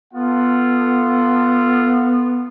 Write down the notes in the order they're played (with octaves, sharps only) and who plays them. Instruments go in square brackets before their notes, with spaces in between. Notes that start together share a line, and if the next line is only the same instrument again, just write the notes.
[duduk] B3 [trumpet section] F4 A4 F#5